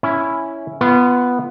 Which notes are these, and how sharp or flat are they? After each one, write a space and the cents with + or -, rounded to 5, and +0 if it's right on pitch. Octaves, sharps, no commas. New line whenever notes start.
C#4 +0 E4 +0
B3 +0 F4 -25